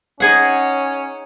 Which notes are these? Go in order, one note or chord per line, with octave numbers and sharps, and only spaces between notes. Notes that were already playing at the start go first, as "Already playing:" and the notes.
C#4 D#4 G#4 F#5